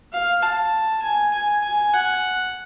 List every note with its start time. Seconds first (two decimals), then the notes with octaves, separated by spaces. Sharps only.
0.13 F5
0.42 A5
1.03 G#5
1.34 G#5
1.64 G#5
1.93 F#5